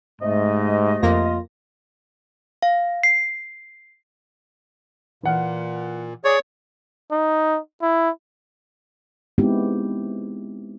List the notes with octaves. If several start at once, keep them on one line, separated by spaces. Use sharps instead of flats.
G#2 C3 A3 D#5
F2 A#3 F4 A#6
F5
C7
A#2 E3 F#5 F6
G#4 C#5 D5
D#4
E4
G#3 B3 C4 D#4 E4 G4